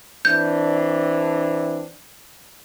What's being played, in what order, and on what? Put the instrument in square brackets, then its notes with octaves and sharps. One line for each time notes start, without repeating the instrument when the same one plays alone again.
[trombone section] E3 C4 D4 [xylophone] G6